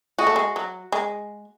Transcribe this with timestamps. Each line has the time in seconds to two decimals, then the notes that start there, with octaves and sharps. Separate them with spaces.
0.18 G#3 F#4
0.27 A3
0.36 G#3
0.56 F#3
0.92 G#3